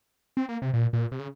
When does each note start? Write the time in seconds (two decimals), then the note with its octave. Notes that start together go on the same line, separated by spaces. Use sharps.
0.37 C4
0.49 A#3
0.62 C3
0.74 A#2
0.93 A#2
1.12 C3
1.19 C#3